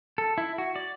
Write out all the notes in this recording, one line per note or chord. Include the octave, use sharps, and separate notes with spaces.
A4
E4
F#4
D5